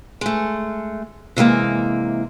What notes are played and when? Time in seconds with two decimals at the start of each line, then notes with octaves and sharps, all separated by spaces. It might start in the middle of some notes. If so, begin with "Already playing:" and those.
0.21 G#3 A3
1.37 C3 E3 G#3 A#3